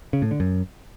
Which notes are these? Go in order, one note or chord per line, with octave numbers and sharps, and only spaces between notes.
C#3
A2
D3
F#2